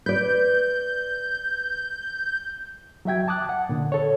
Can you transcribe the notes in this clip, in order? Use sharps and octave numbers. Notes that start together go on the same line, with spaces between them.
B4 D5 G6
F#3 F#4 E5 G5 G#6
A5 D6 D#6 F#6
F#5
A#2 D3
A4 C#5